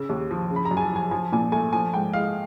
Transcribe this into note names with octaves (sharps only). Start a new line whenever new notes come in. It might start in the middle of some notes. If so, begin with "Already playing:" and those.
Already playing: C#3 E6
D#2
F3
C#3
B5
A#5
F#2
G#5
A5
F3 G#5
F3 G#5
A#2 G#5
A3 G#5
F3 G#5
G#2 G5
G#3 F5